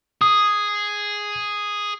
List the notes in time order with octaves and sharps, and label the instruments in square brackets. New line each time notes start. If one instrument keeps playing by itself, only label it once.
[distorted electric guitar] G#4 [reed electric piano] D#6